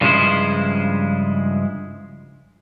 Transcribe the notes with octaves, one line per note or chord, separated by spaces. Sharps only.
G2 C#3 F3 G#3 E4 C5